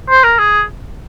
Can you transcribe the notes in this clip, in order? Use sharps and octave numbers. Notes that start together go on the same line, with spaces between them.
C5
A#4
G#4